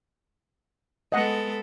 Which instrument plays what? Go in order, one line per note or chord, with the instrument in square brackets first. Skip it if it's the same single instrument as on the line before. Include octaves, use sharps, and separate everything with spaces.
[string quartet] G#3 B3 A4 [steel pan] D#5 F#5